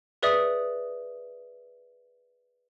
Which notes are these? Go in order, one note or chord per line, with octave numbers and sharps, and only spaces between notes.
G#4 B4 D5 E5 D#6